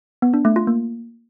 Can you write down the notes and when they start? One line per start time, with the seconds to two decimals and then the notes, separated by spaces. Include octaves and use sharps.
0.22 B3
0.34 D4
0.45 A3
0.56 F4
0.67 A#3